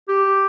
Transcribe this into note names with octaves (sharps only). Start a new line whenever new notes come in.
G4